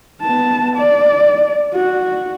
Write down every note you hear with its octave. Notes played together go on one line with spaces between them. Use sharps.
B3 A5
D5
F#4